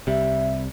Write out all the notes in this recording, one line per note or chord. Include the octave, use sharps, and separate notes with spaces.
C2 C3 G3 E5